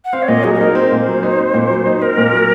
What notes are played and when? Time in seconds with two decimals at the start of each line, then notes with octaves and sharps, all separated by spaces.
0.05 F#5
0.13 C4 F5
0.22 C#5
0.28 A#2 D#5
0.44 F#3 G#4
0.55 G#4
0.60 D#4 A#4
0.75 C4 C5
0.92 A#2
1.07 F#3
1.23 D#4
1.39 C4
1.54 A#2
1.70 F#3
1.86 D#4
2.02 C4 A#4
2.17 A#2
2.32 F#3